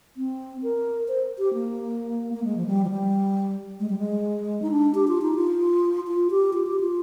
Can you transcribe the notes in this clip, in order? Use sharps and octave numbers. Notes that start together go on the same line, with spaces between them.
C4
A#4
C5
G4
A#3
A#3
G#3
F3
G3
F3
G3
G#3
G3
G#3
D#4
D4
G4
F4
D#4
F4
F4
G4
F4
G4
F4